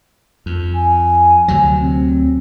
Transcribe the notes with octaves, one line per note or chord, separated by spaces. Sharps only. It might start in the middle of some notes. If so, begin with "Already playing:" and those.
F2
G#5
D2 C3 F#3
C4